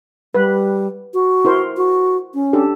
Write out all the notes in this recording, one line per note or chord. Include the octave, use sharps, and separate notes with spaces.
G3 B4
F#4
E4 A#4 C5
F#4
C#4
D4 G4 A4